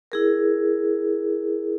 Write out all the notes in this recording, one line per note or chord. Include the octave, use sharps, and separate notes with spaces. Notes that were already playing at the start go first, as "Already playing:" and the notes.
E4 G#4 A#4